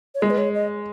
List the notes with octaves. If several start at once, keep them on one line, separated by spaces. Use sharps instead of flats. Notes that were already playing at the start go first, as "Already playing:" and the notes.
C#5
G#3 D#5
B4
C#5
D#5